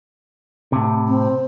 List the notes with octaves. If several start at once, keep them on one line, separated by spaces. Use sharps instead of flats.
A2 C3
C4